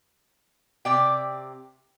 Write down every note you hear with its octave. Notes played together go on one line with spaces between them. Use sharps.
C3 D5 G5